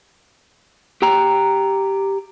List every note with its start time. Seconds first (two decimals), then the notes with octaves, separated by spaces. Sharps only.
1.02 G4 G5 A#5